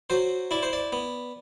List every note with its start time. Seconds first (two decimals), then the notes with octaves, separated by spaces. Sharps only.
0.10 F#3 C5
0.51 E4 D5
0.63 C5
0.73 D5
0.93 B3